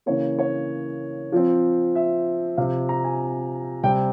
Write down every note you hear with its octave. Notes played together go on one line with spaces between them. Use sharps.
C#3 E3 A#3 C#5
C#5
F3 C4
E5
C3 F3 C4 F5
A#5
G#5
C3 G3 C4 G5